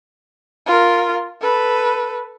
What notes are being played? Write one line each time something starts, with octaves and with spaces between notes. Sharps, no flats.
F4 A#4
A4 B4